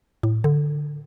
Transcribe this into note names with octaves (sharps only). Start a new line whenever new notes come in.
A2
D3